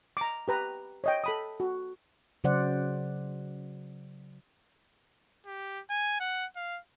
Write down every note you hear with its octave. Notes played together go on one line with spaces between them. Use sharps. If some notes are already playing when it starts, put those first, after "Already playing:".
A#5 D6
G4 B4 A#5
C#5 D#5 G5
A4 B5 D#6
F#4
C#3 F#3 C5 D5 F#5
G4
G#5
F#5
F5